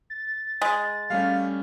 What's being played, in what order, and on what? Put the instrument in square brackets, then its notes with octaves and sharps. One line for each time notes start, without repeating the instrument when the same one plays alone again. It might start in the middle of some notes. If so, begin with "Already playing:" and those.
[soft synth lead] A6
[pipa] G#3
[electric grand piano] G3 A3 C#4 [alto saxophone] F5